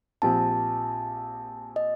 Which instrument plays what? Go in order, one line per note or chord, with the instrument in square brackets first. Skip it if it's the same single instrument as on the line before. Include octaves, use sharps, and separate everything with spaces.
[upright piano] A#1 A#2 F3 C4 G4 [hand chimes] A5
[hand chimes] D#5